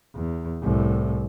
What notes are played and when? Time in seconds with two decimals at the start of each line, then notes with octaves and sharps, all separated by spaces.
0.15 E2
0.62 C2 A2